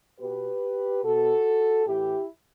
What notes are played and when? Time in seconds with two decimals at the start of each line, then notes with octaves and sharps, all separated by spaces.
0.19 B2 G4 B4
1.03 B2 F#4 A4
1.85 A2 E3 E4 G4